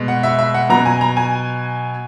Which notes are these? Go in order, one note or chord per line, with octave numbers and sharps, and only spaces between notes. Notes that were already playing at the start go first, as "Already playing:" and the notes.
Already playing: B2 G#3
F#5
E5
E5
F#5
B2 F#3 A#5
G#5
A#5
G#5